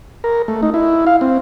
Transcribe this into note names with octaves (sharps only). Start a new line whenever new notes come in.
A#4
A3
D#4
E4
F5
C4